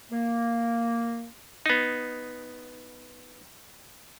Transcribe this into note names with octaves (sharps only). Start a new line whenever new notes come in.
A#3
B3 D#4